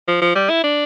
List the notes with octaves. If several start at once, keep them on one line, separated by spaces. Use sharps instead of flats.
F3
F3
G3
E4
D4